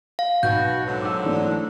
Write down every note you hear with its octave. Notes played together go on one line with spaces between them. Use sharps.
F5
B1 B2 F#4 G6
G#2 D3 F#3
D6 E6
E3 A3 D4